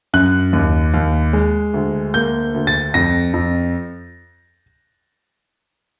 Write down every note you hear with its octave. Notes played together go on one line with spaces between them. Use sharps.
F#2 F#6
D#2
D#2
G#3
D2
A#3 G6
D2
A6
F2 A#6
F2